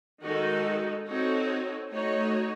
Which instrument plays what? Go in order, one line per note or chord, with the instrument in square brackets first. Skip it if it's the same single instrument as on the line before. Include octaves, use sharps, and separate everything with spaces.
[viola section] D#3 G#3 D#4 F#4 A4
C4 D#4 F#4 A4 C#5
A3 D#4 F#4 C#5